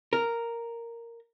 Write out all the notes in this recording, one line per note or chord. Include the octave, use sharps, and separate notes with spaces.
A#4